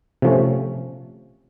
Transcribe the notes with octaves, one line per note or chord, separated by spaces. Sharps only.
C3 F3 A3 C#4